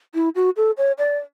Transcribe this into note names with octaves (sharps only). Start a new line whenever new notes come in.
E4
F#4
A4
C#5
D5